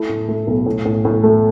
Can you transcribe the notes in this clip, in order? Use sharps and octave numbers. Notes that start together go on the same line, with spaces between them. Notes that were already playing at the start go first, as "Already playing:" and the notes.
Already playing: A3 E4
A2
A3
B1
A2
A2
A2
A3